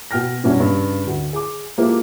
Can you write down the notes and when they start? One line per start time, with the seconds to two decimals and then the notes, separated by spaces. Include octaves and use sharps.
0.11 B2 G5 F6 A#6
0.43 F#2 B2 G3 C#4 D4 E4
0.60 G2 C#3
1.07 D2
1.33 G#4 D6
1.78 F3 G#3 A#3 E4 G4 B4